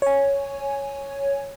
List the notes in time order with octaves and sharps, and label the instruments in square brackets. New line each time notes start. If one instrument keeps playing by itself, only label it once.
[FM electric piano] C#5 G#5